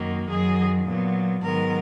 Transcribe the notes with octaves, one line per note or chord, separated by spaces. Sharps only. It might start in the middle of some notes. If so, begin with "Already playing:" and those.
Already playing: F#2 D#3 F#3 A#3
F#2 D#3 F#3 G#4
A#2 F#3 B3
G#2 D#3 F#3 B3 A#4